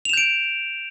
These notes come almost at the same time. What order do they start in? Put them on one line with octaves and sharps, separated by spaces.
F7 E7 G6 D7